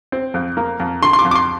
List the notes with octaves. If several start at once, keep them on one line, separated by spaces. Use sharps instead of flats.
C4
F2
A#3
F2
D3 C6
C6
D6
F2
D6
C6